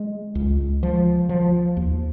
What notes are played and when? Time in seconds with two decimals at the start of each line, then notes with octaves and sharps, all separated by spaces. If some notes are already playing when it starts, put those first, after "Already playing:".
Already playing: G#3
0.35 C#2
0.83 F3
1.29 F3
1.77 D#2